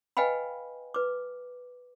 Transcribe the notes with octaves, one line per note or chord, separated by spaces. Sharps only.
B4 D#5 F5 G5 G#5 B5
B4 D6